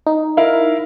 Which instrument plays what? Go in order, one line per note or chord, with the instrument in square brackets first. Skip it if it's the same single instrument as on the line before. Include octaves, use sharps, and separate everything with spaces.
[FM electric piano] D#4
[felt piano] E4 A#4 F5